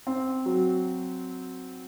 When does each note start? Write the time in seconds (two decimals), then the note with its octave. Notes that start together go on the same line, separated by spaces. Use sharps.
0.07 C4
0.46 F#3